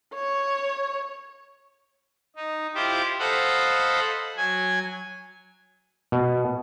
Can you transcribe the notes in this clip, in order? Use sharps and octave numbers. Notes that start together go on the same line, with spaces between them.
C#5
D#4
E4 F4 G4 C5
A4 C5 D#5 F5 F#5 B5
F#3 G#5
B2